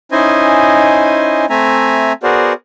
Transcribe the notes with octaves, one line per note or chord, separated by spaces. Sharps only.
C#4 D#4 E4 C5 D#5 G#5
A3 C4 E5 G#5 A#5
B3 F#4 G#4 A#4 C5 D5